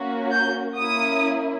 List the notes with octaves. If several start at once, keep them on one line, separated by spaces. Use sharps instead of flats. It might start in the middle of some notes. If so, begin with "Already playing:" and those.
Already playing: A#3 C#4 F#4
G6
A#3 C#4 E4 D#6